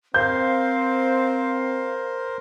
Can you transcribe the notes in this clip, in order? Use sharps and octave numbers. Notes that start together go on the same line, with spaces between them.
C4 A#4 C5 F5 G6